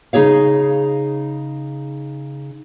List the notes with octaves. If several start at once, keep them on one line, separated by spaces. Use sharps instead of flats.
C#3 D#4 G4 G#4 C#5 F5